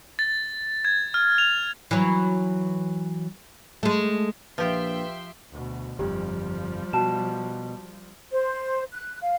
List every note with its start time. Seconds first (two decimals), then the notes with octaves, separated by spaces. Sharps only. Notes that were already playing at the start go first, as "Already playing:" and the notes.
0.19 A6
0.85 G#6
1.14 F6
1.38 F7
1.91 E3 F#3
3.83 G#3 A3
4.58 A#1 F3 G4 B4 E5 G5 C6
5.52 D2 B2
5.99 G1 F2 F3 G3 G4
6.93 B2 F#4 A5 E7
8.31 C5
8.92 F#6
9.21 F5